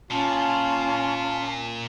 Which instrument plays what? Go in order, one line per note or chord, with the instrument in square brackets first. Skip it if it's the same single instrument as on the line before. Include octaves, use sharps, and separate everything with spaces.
[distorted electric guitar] A#2 [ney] C#4 [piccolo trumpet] F4 [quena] A5